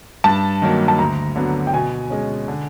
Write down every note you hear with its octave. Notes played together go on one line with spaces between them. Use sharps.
G2 A5
D#3 F#3 A#3
A5
D2 A#5
D3 F#3 B3
G5
B2 G#5
G#3 C#4
D3